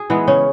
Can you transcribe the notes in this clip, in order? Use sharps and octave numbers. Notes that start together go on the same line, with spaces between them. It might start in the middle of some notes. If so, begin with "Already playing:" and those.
Already playing: G#4
E3 G#3 B3
C#3 C#4